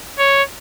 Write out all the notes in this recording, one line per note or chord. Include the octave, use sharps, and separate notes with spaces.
C#5